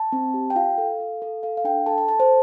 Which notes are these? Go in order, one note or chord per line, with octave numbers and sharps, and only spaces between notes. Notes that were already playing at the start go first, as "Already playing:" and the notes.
Already playing: A5
C4
G4
G5
F4 F5
A4
A4
A4
A4 F5
F5
D4 G5
A4 A5
A5
A4 A5
C5